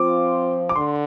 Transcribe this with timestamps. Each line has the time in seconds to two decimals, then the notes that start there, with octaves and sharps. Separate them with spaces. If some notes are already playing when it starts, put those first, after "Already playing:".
Already playing: F3 C4 F4 C5 D6
0.69 D6
0.75 D3 C6